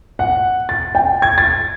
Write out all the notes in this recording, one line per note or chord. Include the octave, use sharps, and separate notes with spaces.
F#5
A6
G5
G#6
A6